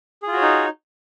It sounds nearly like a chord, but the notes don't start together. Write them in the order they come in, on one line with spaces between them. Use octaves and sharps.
G#4 F4 F#4 C#5 D#4